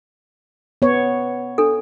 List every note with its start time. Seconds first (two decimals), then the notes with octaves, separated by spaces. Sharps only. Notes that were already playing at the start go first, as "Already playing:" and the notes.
0.82 B3 C#5
1.58 D4 A4